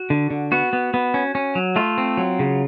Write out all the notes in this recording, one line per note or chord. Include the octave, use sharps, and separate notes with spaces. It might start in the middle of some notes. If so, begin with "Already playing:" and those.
Already playing: F#4
D3
D3
B3 F#4
B3
B3
C#4
C#4
F#3
A3 F4
C4
F#3
C#3